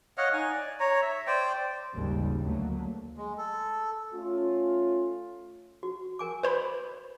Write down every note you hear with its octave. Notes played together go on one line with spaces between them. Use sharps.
C#5 D#5 F5 F#5
D#4 G#5
D5
C#5 A#5
E5
C5 D5 G5
G#1 D#2 C#3 G3
D2 F#3 A3 A#3
G#3
A4
A3 C#4 F4
F#4
A#4 G#5 D6
B4 C5 B5